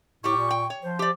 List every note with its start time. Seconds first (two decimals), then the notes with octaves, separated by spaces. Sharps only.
0.24 A2 G3 G4 C#6
0.36 A#2
0.51 G5
0.70 C#5
0.83 F3 C5
0.99 G4 D5